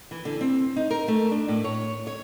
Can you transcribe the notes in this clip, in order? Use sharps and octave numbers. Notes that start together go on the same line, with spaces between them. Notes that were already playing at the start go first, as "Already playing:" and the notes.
E3
D3
C4
D#4
A#4
A3
D4
A2
C#5
C#5